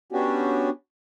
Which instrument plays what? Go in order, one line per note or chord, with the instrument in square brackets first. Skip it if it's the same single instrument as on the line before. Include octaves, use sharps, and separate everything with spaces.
[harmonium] B3 C#4 D4 F#4 G4